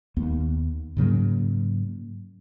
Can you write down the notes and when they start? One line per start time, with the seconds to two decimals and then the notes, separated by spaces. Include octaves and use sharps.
0.17 D#2 B3
0.97 G#2 C#3 F#3 A#3